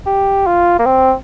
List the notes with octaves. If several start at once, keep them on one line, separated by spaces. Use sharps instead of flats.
G4
F4
A#3
C4